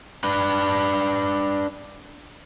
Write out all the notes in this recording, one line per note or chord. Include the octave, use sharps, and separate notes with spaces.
D4 B4